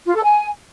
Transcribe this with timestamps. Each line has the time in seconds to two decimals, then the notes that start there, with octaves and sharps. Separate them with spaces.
0.07 F4
0.15 A4
0.24 G#5